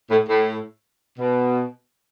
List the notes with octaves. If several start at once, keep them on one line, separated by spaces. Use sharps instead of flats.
A2
A2
B2